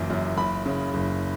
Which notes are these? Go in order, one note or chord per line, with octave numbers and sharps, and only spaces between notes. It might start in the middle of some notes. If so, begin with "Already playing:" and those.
Already playing: F#1 F#2 E3
F#2
F#1 B5
C#3
F#1